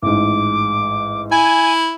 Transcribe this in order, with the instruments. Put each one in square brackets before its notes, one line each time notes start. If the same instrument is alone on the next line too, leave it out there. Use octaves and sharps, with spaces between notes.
[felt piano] A1 G#2 [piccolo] D6
[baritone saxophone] E4 [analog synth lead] G#5